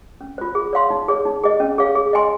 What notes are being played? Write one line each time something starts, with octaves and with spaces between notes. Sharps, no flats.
C#4
F4 C5
G#4
C#5 F5 C6
D#4
G#4 C#5
D#4
G#4 D#5
C#4
G#4 C#5 F5
G#4
D#5 G#5 C6